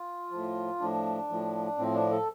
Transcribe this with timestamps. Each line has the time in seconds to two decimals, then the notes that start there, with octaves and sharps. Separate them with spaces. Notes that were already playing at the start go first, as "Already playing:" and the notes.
Already playing: F4
0.31 A2 F3
0.80 A2 F3 D4
1.29 A2 F3
1.78 A2 F3 C4
1.94 D4
2.11 A4